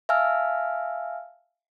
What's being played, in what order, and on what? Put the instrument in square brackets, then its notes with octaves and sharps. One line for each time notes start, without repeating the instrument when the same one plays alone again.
[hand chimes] E5 F5 G#5 A5 E6 F6